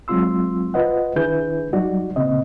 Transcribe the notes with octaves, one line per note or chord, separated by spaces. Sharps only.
F#3 G#3 C4 F4 C6 E6
F4 B4 C5 D#5 F#5
D#3 D4 E4 G#4 B4 G6
F#3 G3 D#4 F#4 D5
A#2 C#3 C4 D#5